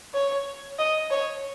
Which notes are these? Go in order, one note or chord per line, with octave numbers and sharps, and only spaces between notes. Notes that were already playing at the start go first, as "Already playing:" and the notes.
C#5
D#5
C#5